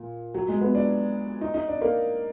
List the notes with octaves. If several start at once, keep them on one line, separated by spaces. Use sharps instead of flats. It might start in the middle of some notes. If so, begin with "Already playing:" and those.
Already playing: A#2
F#3
G#3
B3
D4
D#4
D#4
D4
A#3